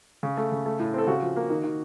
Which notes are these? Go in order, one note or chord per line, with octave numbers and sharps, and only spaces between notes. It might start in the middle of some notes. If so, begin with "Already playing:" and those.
C#3
A3
C#3
A3
A2
C4 A4
C#3 F#4
F3
A#3
D#3
D#3